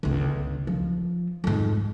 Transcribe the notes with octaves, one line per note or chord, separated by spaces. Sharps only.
G1 C#2
F3
F2 G#2